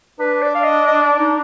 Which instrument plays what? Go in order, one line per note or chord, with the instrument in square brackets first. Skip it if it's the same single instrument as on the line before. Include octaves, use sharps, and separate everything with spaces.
[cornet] D4 [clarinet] B4
[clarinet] D5
F5
D#5
D#5
D5
D#4